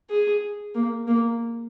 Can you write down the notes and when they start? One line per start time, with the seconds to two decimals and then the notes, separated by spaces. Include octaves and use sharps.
0.10 G#4
0.75 A#3
1.08 A#3